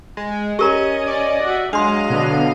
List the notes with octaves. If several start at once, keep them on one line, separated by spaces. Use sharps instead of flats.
G#3
C#4 G4 A#4 D#5 A#5
D5
F#4 E5
F#3 G#3 D4 D#5 F5 C6
B2 D3 B3